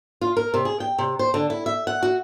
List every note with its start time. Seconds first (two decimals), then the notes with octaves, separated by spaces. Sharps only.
0.21 F4
0.37 A#4
0.54 C3
0.65 G#4
0.80 G5
0.98 C3
1.19 C5
1.34 D3
1.50 E4
1.66 E5
1.87 F#5
2.03 F#4